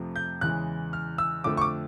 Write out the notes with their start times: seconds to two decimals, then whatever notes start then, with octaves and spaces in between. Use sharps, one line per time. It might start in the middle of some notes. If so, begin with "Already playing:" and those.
Already playing: F2 C3 F3 A3
0.16 G6
0.41 E2 C#3 E3 G#3 F#6
0.93 F6
1.18 E6
1.44 F2 D3 F3 A3 D6
1.57 C#6
1.61 D6